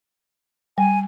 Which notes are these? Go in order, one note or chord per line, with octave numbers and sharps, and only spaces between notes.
G3 G#5